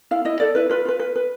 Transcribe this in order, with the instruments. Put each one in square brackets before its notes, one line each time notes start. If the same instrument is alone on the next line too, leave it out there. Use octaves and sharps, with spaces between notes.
[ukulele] E4 F5
E4 D#5
A4 D5
E4 B4
F4 B4
F4 B4
B4
B4